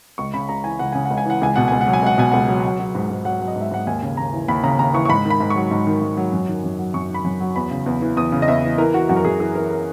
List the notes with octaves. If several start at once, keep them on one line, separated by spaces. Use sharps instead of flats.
C#2 C#6
C#3 B5
C#2 A#5
E3 G#5
C#2 F#5
C#3 G#5
F#5
C#2
G#5
E3 F#5
C#2 G#5
B2 F#5
C#2 G#5
F#5
F#3
G#5
C#2 F#5
B2 G#5
C#2 F#5
F#3
F#3
F#3
G#2
G#2
F#3 F#5
F#3
D#5
G#2
E5
G#2 F#5
D#2 G#5
C#3
D#2 A#5
E3
D#2 B5
C#3 A#5
D#2 A#5
E3 C#6
C#6
G#2 B5
D#3
B5
G#2
C#6
F#3
G#2
D#3
G#2
F#3
F#2
D#3
F#2
F#3
F#2 C#6
D#3
B5
F#2
F#3
E2 B5
C#3
E2
E3
E2 D#6
C#3
D#5
E2 E5
E3
E3 A#4
E3 F#4
F#2 F#4
A#4
F#2 G#4
E3 G#4
E3 A#4
A#4